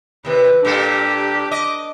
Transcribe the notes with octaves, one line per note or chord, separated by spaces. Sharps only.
D#2 C3 B4
A#2 G3 D4 G4 A4
D#5 D6